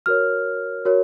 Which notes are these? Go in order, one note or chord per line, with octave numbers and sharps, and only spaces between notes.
F#4 A#4 C#5 F6
F#4 A#4 C#5